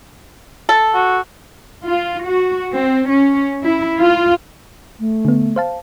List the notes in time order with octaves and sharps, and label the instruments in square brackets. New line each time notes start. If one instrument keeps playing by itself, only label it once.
[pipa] A4
[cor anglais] F#4
[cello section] F4
F#4
C4
C#4
E4
F4
[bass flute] A3
[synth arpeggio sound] D3 B3
C5 F5 A5